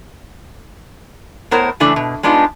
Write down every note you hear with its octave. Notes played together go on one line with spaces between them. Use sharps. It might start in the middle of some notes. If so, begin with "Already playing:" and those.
A2 B3 A#4 C5 C#5
C#3 E3 A3 D4
B2
G#3 B3 D4 D#4 F4